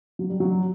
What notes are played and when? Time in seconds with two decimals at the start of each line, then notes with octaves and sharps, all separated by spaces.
0.19 F#3
0.30 G3
0.40 F#3